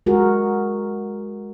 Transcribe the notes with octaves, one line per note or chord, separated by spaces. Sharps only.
G#3 F#4 G#4 A#4